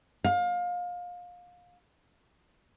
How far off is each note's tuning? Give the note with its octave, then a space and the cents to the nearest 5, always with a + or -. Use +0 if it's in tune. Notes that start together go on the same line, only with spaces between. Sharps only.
F5 +25